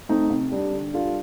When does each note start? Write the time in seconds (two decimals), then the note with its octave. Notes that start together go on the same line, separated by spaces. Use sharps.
0.09 A3 C4 D#4
0.30 C3
0.52 G3 D4
0.72 D3
0.93 G3 D4 F4 A4